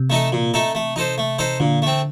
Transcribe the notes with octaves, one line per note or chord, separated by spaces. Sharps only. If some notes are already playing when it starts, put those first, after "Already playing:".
Already playing: C3
A3 D#4 A4
A#2
A3 D#4 A4
A3
D#4 A4 C5
A3
D#4 A4 C5
A#2 D3
A3 C4